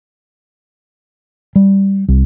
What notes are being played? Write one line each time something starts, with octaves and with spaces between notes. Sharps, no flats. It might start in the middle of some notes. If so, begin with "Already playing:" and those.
G3
C2